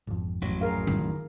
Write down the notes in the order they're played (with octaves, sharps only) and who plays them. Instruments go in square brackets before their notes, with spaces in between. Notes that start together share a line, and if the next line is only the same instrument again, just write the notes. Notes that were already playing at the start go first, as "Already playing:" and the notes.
[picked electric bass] G#1 F2
[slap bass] A1 F#3
[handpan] G#4 A#4 F5
[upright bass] D#3